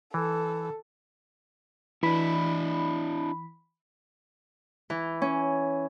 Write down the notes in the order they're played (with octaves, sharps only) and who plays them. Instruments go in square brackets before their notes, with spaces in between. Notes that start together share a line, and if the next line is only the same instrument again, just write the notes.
[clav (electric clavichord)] E3 [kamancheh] A4
[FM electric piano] E3 B5 [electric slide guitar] D4 E4
[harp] E3
C#4